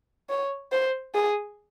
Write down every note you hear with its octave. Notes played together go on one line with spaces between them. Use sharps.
C#5
C5
G#4